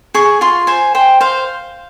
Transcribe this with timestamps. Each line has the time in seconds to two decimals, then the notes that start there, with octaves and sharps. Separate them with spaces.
0.14 G#4 C#6
0.41 F4 C6
0.67 C5 G#5
0.95 C5 G5
1.21 C5 F5